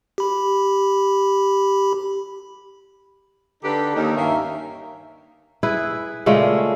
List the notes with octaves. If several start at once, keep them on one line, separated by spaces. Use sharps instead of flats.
G4 B5
D3 D4 D#4 G4 A4 B4
D#2 D#4
G2 D#3 A#3 C#4 E5
E4 G#4 B4
A#2 C#3 G#3 A3